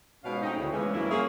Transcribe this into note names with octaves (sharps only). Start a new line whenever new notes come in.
G#2 B2 F3 C#4 F5
A3 C4 C#4 D#4
D2 C#3 E4
E2 C#3 E3 F3 G#3 C#4
G2 E3 F#3 A#3 E4
A#3 C#4 F4 G#4